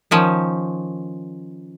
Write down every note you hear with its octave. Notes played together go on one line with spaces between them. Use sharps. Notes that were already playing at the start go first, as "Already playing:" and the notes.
D#3 F3 C#4